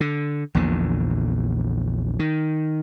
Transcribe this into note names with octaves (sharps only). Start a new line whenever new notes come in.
D3
A#1 E2 A#2 D3
D#3